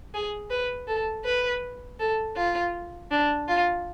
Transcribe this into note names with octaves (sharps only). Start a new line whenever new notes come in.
G#4
B4
A4
B4
A4
F4
D4
F4